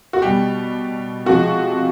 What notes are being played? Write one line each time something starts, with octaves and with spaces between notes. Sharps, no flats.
F#4
B2 G3 G4
C3 F3 G#3 F#4